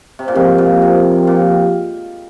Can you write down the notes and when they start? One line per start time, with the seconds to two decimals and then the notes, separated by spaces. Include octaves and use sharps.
0.19 C3
0.28 A#2
0.35 G#2 F3 C4 G4 A#4
0.58 A#2
0.82 C3
1.27 A#2